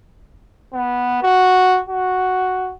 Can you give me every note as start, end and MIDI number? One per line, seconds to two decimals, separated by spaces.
0.73 1.20 59
1.23 1.81 66
1.89 2.73 66